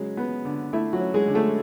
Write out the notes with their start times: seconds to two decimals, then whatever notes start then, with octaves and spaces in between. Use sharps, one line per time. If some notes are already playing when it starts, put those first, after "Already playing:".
Already playing: C#3 F#3 G#3
0.17 B3
0.45 D3
0.73 A3 E4
0.93 F#3 F#4
1.01 C#4
1.14 G#3 G#4
1.28 D3
1.35 A3 A4